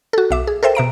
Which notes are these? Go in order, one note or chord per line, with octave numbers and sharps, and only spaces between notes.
F#4 A4
B1 E5 D6
G#4
A4 A#4 C5 E5 G5
B2 E5 A#5 D7